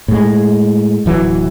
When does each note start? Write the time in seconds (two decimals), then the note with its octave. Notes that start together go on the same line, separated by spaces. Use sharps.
0.08 A2 G#3
1.06 D1 E3 F#3